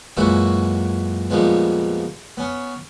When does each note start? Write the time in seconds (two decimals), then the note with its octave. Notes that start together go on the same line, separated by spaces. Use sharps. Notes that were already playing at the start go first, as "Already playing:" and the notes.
0.17 F#2 A#2 E3 G#3 E4 F#4
1.30 F2 A#2 G3 G#3 B3
2.37 B3 C#4